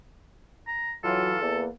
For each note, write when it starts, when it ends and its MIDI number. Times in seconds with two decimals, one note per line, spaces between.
0.67 0.94 82
1.04 1.40 52
1.04 1.33 54
1.04 1.40 65
1.04 1.61 69
1.42 1.66 40
1.42 1.68 58